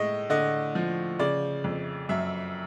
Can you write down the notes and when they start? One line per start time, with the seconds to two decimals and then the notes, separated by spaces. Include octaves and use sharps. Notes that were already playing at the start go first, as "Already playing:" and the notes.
Already playing: A2 G#3 D#5
0.30 D3 D#5
0.75 F3
1.19 C#3 D5
1.64 F2
2.09 F#2 E5